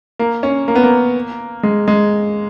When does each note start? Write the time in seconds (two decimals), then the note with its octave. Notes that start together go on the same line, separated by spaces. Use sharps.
0.19 A#3
0.43 C#4
0.68 A#3
0.75 B3
0.83 A#3
1.63 G#3
1.88 G#3